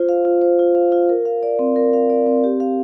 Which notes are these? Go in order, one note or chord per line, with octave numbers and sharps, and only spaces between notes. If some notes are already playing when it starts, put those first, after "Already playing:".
Already playing: F4 C5
F5
F4
C5
F4
F5
F4
A#4
F5
D5
C4
A#4
F5
D5
C4
G4
F5